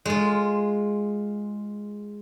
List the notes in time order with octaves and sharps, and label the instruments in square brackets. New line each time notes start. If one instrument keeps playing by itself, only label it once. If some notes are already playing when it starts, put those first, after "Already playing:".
[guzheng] G#3 F4